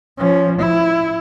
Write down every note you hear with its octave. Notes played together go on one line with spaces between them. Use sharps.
F3 C#4
E4